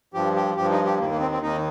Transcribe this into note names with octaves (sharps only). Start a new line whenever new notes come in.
G2 F3 G4
G4
G2 F3 G4
D#4
G4
D#2 D#3 A#3
A#3
C4
C4
D#2 D#3 D#4